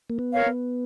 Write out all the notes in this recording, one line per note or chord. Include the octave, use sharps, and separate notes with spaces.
A#3
B3
A#4 C#5 F5
B3